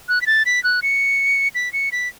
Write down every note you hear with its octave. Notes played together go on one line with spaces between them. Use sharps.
F#6
B6
A6
B6
F#6
C#7
B6
C#7
B6